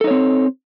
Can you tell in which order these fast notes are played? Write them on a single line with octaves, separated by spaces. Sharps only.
A4 D#4 C#5 C4